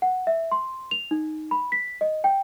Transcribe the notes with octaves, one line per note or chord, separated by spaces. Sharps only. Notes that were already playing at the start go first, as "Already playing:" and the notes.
F#5
E5
C6
F7
D#4
B5
B6
D#5
G5